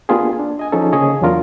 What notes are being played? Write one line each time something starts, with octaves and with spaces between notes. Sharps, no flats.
A#3 B3 D4 F4 G4 G#4
D4
D#5 G#5
F3 C#4 D#4 G#4 A4
C#3 A#3 G#4 C#5 D#5
E2 F#3 D4 F4 A#4